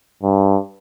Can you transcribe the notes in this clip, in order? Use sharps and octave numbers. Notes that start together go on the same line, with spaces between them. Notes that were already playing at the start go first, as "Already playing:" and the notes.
G2